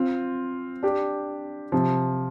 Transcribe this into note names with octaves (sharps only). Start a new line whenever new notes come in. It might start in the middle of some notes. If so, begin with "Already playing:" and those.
Already playing: C4 F4
D4 G4
C3 F3